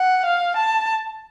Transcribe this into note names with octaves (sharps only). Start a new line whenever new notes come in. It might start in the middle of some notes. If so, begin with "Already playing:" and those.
Already playing: F#5
F5
A5